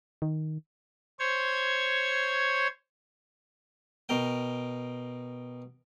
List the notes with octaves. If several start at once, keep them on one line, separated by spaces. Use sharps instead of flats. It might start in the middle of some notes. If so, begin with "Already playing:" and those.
D#3
C5 C#5 G#6
B2 A#4 G5